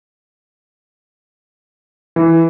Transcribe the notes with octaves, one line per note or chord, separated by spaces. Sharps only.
E3